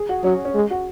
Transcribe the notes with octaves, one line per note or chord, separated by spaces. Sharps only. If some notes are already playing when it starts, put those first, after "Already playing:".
Already playing: G#4
F#4
F#3 C#4
C#4
G#3
F#4